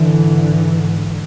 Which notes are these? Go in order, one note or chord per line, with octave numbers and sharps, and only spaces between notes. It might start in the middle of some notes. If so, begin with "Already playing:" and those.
Already playing: G#2 D3 E3